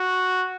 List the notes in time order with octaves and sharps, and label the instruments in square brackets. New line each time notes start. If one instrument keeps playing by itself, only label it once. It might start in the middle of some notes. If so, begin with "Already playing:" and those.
Already playing: [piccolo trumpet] F#4